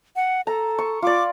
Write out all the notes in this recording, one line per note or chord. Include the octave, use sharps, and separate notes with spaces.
F#5
A4 A#5
C#6
F4 D5 D6